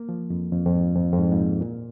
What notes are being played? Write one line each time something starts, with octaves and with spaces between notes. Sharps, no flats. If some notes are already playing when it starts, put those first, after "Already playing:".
Already playing: A#3
F3
F2
F2
F2
G#2
F2
F2
G#2
G#2
A#2
A#2